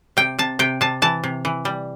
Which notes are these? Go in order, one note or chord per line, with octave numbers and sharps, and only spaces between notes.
C3 G5
C3 A5
C3 G5
C3 A5
E3 A5
C3
E3
G3